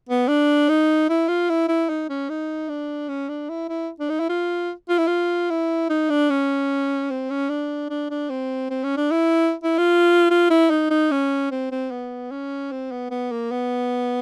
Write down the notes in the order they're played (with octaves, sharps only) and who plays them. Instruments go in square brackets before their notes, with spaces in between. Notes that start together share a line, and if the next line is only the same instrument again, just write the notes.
[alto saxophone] B3
D4
D#4
E4
F4
E4
E4
D#4
C#4
D#4
D4
C#4
D4
E4
E4
D4
D#4
E4
F4
F4
E4
F4
E4
D#4
D4
C#4
C4
C#4
D4
D4
D4
C4
C4
C#4
D4
E4
E4
F4
F4
E4
D#4
D#4
C#4
C4
C4
B3
C#4
C4
B3
B3
A#3
B3